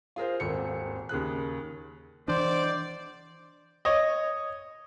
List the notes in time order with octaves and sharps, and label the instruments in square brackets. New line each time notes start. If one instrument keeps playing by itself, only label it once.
[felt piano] F4 G#4 A#4 C5
D#1 G#1 C4 A4 C#7
D#2 C#3 G#4 F#6
[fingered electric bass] E3 D4 [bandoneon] C5 [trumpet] D5
[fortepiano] C#5 D#5